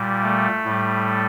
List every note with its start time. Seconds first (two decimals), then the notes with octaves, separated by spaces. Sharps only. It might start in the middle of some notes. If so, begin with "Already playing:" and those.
Already playing: A#2 G3
0.23 A3
0.64 A2 G3